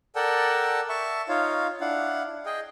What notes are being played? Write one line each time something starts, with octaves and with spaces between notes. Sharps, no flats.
A4 A#4 D5 F#5 G5 A5
E5 A5 C#6
D#4 F4 C#5 F5
D4 E4 F5 F#5
G#4 D#5 G5